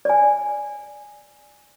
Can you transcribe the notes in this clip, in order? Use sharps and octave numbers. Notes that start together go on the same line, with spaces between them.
D5 G#5